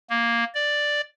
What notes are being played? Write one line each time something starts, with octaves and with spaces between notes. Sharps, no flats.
A#3
D5